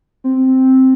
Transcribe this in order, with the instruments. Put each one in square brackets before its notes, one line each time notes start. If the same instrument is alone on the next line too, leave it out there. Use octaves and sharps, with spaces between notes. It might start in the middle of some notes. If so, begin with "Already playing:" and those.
[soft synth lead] C4